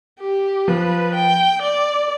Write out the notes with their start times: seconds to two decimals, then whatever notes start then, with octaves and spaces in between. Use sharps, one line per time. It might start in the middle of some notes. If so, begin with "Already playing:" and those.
0.20 G4
0.68 F3 B4
1.15 G5
1.62 D5